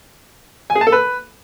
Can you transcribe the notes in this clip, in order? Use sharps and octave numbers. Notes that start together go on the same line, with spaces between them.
G#5
G#4
A5
A4
B4